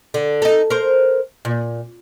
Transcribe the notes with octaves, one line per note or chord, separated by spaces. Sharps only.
D3
D#4 A4
A#4 C5
A#2